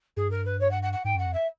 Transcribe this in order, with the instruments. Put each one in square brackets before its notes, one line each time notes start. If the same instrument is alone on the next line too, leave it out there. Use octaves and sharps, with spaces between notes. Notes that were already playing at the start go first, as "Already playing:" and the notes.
[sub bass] G2 [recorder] G#4
[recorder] A#4
B4
C#5
F#5
F#5
F#5
[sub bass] G#2 [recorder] G5
[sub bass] F#2 [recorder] F#5
[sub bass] F2
[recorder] E5